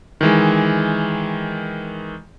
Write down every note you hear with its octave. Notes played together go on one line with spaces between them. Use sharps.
D#3 E3 G#3